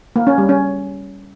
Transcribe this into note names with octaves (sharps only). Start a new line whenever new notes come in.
A#3
C#4
G3
C#4